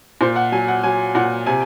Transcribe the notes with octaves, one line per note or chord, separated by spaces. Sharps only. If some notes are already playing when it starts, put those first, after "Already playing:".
A#2 C5
F#5
F#3 G#5
F#5
F#3 G#5
A#2 F#5
C3 G#5